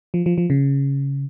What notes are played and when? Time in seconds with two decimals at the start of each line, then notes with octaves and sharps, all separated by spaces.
0.14 F3
0.26 F3
0.38 F3
0.50 C#3